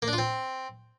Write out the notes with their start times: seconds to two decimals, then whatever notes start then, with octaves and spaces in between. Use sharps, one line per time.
0.02 A#3
0.08 D4
0.13 F4
0.18 C4